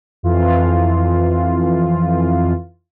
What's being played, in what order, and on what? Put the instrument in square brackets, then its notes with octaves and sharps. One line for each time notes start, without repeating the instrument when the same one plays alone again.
[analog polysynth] F2 E3 F4